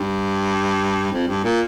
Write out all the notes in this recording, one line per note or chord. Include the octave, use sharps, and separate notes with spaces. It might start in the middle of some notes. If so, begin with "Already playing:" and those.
Already playing: G2
F2
G2
A#2